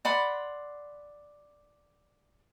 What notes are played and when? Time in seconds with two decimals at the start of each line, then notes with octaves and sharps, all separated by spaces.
0.05 D5 F#5 B5 C6